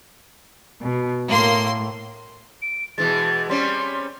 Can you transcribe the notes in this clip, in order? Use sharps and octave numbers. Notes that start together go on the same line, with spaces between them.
B2
A2 A#3 C6
D7
B2 E3 G#3 A6
G3 C4 C#4 C6